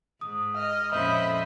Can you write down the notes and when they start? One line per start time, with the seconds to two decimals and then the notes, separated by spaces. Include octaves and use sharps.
0.21 G#2 D#6
0.56 D#5 F6
0.91 F2 A#2 C#4 C5 D#5 E5 B5